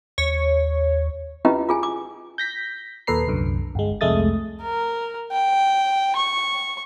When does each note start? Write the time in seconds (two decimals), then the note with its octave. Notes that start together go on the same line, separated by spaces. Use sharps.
0.18 D#2 C#5
1.45 C#4 E4 F4 G4 B4 D#5
1.69 F4 G#4 G#5
1.83 D6
2.38 G6 A#6 B6
3.07 D#2 A#2 A4 B4 A#5 C7
3.27 C2 F#2 D3
3.75 G1 G#3
4.01 C2 F2 G#3 A3 D#6 A6
4.62 A#4
5.32 G5
6.16 C#6